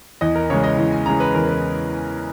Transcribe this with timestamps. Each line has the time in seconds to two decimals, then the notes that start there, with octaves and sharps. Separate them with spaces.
0.21 E2 D#5
0.35 A#4
0.50 C#3 E3 G#3 C#5
0.64 D#5
0.78 E2
0.92 G#5
1.06 C#3 E3 G#3 A#5
1.20 B4
1.34 E2 A#4
1.49 B4